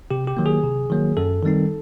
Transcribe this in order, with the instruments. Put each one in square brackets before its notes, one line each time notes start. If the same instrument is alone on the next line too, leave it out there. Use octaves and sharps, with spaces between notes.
[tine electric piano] C3 G4
G4
D#3 F#3 A#3
G#4
C3
D#3 F#3 A#3
F#2 A4
D#3 G3 C4 D#4